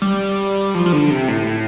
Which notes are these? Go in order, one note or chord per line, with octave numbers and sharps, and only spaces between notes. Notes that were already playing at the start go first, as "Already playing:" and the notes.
G3
F3
F3
D3
C3
A2
A2